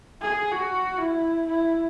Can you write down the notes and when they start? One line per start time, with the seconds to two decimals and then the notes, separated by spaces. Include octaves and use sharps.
0.21 G#4
0.52 F#4
0.98 E4
1.46 E4